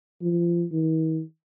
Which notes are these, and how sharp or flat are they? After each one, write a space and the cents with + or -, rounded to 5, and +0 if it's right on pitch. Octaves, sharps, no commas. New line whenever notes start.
F3 -25
D#3 +45